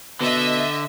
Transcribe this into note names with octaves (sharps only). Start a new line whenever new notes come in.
B2 D3 D#5 E5